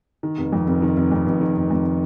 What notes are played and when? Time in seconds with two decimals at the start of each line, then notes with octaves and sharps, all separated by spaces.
0.23 D#3
0.38 F1
0.53 F2
0.67 F1
0.82 D#3
0.97 F1
1.12 F2
1.26 F1
1.41 D#3
1.56 F1
1.70 F2